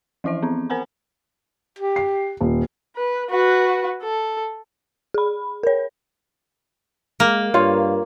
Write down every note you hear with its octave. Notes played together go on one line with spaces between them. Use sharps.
E3 F3 E4 C5 E5
B3 C4
A#4 C5 F#5 G#5 A#5 B5
G4
C7
D#1
B4
F#4 B4
A4
G#4 B5
A#4 C#5
G#3 A#3
G2 F4 C#5 F5